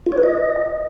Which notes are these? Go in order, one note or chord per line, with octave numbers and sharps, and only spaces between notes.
F4
C#5
B4
D#5